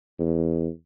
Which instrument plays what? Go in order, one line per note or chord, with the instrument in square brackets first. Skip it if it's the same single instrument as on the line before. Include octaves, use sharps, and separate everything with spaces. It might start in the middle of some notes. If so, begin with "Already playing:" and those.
[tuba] E2